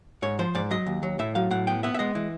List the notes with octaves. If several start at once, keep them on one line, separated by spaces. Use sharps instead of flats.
G#2 C#5
F3 C5
G#2 D5
F#3 D#5
D#2
F#3
A2 E5
F#3 F5
A2 F#5
B3 G5
B3 E5
E5
G#3 D#5
E3